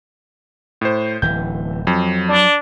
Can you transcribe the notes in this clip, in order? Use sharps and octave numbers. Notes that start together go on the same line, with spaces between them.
A2 C5
D1 E3 G6
F2 F#3
D4